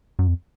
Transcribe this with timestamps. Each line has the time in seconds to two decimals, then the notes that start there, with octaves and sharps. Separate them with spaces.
0.19 F#2
0.28 F2